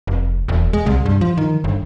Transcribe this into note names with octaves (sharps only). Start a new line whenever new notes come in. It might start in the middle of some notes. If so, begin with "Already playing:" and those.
F1
E1
G#3
C2
G2
F3
D#3
G1